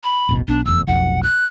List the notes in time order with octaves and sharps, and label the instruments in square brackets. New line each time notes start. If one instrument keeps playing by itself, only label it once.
[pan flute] B5
[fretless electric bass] D#1 A1 B2
[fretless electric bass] B1 B3 [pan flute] D4
[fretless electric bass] F1 E2 [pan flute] E6
[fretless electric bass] F1 B1 F2 [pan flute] F#5
[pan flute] F#6